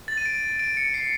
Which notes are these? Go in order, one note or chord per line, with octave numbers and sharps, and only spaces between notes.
A6
D#7
D7
D7
C#7
C7